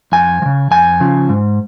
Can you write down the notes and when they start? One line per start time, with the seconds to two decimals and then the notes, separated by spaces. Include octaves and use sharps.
0.12 F2 G#5
0.42 F3
0.46 C#3
0.71 F2 G#5
1.00 C#3 F3
1.29 G#2